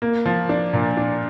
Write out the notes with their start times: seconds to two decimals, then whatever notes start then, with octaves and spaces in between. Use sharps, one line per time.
0.02 A#3
0.26 F3
0.49 D4
0.73 A#2
0.97 D4